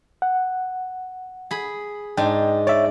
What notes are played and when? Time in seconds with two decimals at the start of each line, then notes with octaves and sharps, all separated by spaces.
0.22 F#5
1.51 G#4 B5
2.17 G#2 D4 D#4 G5
2.67 C#5 D5 E5